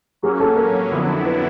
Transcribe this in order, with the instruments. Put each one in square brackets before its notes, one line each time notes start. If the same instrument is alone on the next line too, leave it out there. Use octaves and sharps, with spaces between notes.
[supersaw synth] F#3 A#3 C#4 [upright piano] G#4
[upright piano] A4
A#4
[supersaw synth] F2 D3 F#3 B3 E4
[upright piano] B4